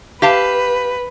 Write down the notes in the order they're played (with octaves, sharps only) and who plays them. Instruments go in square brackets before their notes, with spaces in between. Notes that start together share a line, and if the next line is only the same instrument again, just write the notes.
[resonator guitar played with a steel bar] G4 F5 A5 [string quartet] B4